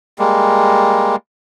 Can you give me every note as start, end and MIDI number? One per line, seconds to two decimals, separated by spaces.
0.19 1.16 55
0.19 1.16 56
0.19 1.16 58